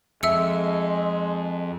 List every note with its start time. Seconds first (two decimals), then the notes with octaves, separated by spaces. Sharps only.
0.23 F2 G#3 E5 E6 C#7